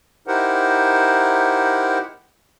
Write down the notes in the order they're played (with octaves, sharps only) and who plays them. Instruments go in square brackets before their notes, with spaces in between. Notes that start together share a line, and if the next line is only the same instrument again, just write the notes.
[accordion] D#4 E4 G4 A#4 C5 F#5